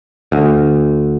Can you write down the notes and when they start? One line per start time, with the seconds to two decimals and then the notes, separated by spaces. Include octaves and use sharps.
0.32 D2